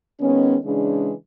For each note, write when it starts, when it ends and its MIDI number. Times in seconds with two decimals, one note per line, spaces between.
0.20 0.56 51
0.20 0.56 56
0.20 0.56 59
0.20 0.56 61
0.64 1.11 49
0.64 1.11 52
0.64 1.11 56
0.64 1.11 62